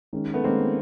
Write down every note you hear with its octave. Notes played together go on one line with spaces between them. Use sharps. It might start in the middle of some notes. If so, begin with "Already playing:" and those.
D#3 G#3 C#4
A3 B3
D#3 G#3 A#3 C4 C#4